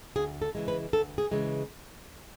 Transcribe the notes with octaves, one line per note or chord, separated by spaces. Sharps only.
D2 G#4
A4
C#3 E3 G#3
B4
D2 A4
G#4
C#3 E3 G#3